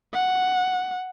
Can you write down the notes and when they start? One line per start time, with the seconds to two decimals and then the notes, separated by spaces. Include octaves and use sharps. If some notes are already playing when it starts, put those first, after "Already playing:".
0.14 F#5